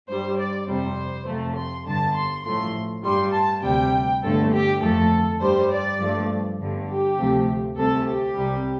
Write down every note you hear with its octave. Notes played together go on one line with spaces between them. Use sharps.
G2 G3 C5
D5
F2 C3 G3 C5
F2 C3 F3 A3
C6
G1 G2 D3 A5
C6
A1 A2 F3 A3 C6
G2 G3 C6
A5
D2 C3 G3 G5
G1 G2 D3 A3 A4
G4
F2 F3 A3 A4
G2 G3 C5
D5
G2 F3 A3
G1 G2 D3
G4
D2 C3 F3 A3
C2 C3 A3 A4
G4
C2 C3 G3